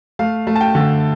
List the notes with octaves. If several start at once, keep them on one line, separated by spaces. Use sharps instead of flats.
A3 F5
A3
A5
G5
D3